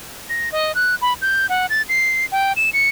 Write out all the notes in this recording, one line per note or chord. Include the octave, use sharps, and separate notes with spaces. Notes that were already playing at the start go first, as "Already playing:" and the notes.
A#6
D#5
F#6
B5
G6
F#5
A6
C7
G5
E7
C#7